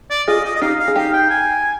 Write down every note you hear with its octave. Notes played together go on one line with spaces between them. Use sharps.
D5
F4 G#4 D#5
D#5
D#5
D#4 G4 F5
F5
G#4
D#4 G4 F5
G5
G#5